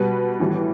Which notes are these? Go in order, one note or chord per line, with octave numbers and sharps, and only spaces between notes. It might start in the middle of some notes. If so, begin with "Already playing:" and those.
Already playing: B2 G3 B4
A2 E3 G3